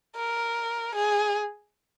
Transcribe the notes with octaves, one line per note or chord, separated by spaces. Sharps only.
A#4
G#4